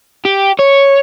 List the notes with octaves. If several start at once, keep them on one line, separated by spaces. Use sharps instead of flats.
G4
C#5